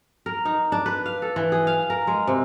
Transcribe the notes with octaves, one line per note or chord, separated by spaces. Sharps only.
A#4
D#4
D4
B4
F5
A4
E3
G#4
F5
A#4
G#3
C3